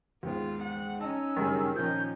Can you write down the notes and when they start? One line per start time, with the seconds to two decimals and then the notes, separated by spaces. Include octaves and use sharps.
0.23 D#2 G#2 B3 F4
0.63 F#5
1.01 C#4 D#4 D#5 A5 E6
1.37 F#1 G2 D#3 G#4
1.76 A#2 F3 C#4 D#4 G6